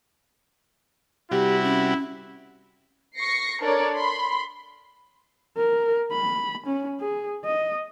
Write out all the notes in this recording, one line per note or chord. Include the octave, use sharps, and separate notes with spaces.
C3 G3 E4 F#4 G4
C#4
C#6 A#6 C7 C#7
D4 A4 A#4 C#5 D5
B5 C6
A#4
B5
C#4
G#4
D#5